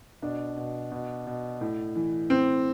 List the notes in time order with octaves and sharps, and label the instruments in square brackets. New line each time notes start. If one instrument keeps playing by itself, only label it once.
[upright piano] B2 D4
B2
B2
B2
A2
E3
A2 C4